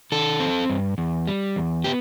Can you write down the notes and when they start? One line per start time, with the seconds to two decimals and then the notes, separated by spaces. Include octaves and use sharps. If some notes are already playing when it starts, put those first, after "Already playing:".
0.12 D#3 A4
0.40 C4
0.70 G2
0.98 E2
1.27 G3
1.56 E2
1.84 B3 G4